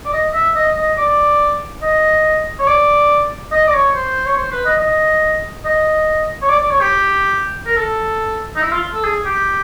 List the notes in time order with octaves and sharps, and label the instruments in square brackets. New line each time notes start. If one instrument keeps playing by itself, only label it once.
[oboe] D5
D#5
E5
D#5
D#5
D5
D#5
C#5
D5
D#5
D5
C#5
C5
C#5
C5
B4
D#5
D#5
D#5
C#5
D5
D5
C#5
G4
A#4
A4
D#4
E4
F4
A4
G#4
G4